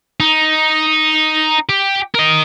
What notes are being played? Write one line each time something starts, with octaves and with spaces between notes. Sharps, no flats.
D#4
G4
A#4 D#5